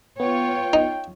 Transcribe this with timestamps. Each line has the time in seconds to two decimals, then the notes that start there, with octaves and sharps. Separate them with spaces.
0.20 B3 F4 C#5 G5
0.73 D#4